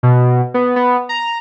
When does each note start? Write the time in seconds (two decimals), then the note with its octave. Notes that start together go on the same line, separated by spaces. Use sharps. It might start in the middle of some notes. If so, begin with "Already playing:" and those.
0.03 B2
0.54 B3
0.76 B3
1.09 A#5